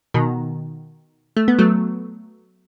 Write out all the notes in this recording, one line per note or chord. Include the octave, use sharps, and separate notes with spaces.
B2 D#3
A3
B3
F#3 A3